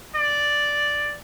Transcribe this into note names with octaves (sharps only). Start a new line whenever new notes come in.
D5